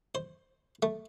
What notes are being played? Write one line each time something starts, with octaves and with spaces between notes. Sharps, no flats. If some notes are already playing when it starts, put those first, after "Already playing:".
C5
A3